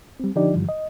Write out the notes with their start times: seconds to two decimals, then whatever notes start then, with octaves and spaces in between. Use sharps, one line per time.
0.20 G3 C4
0.35 D3 F3 D4 D#4 G4 D5
0.53 G2 D3 E3 F3 G3
0.69 D#5